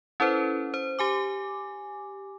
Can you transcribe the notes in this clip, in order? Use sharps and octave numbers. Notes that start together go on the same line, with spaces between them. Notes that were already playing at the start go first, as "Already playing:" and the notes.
C#4 E4 A4 B4 C5
C5
G4 G#5 D6